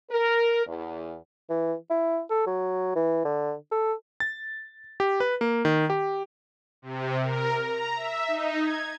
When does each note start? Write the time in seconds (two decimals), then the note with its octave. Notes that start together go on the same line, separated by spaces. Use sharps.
0.10 A#4
0.67 E2
1.50 E3
1.90 E4
2.30 A4
2.47 F#3
2.95 E3
3.25 D3
3.71 A4
4.20 A6
5.00 G4
5.20 B4
5.41 A#3
5.65 D#3
5.90 G4
6.82 C3
7.23 A#4
7.64 A#5
7.95 E5
8.28 D#4
8.61 G#6